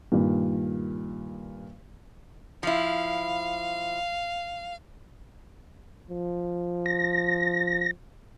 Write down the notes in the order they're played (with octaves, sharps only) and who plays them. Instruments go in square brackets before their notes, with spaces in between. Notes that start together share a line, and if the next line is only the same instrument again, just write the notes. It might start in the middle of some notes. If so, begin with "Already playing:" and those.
[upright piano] G2 A#2 D#3
[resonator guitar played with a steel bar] F3 E4 [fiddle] F5
[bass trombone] F3
[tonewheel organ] A#6